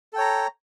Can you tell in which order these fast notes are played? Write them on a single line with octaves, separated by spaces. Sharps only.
A4 G5 C#5 A#5